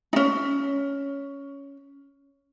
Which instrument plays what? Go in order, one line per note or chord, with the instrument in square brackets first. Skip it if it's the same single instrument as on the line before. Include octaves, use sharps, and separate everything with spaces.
[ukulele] C#4 D#4